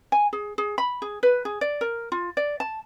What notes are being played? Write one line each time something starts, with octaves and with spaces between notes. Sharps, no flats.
G#5
G#4
G#4
B5
G#4
B4
G#4
D5
A#4
F4
D5
A5